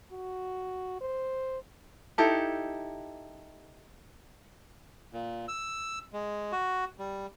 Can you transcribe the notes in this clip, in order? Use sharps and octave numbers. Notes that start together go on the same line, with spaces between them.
F#4
C5
D#4 E4 G4 A4
A#2
E6
G#3
F#4
G3